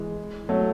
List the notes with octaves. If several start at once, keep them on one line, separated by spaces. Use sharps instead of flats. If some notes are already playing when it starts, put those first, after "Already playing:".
Already playing: E3 G#3
F#3 A3